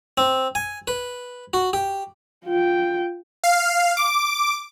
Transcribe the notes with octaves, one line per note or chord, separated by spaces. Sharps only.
C4
G#5
B4
F#4
G4
F4 G5
F5
D6